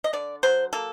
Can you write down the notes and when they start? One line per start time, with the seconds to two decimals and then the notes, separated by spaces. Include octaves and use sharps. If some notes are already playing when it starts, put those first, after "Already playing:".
0.04 D#5
0.13 D3 D5
0.43 F#3 C5
0.73 A#3 A4